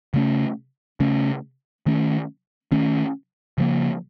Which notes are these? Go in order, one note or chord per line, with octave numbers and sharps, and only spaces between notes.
C#3 A3 C#4
C#3 A3 C#4
D#3 A3 C#4
D#3 A3 C#4
C#3 F3 A#3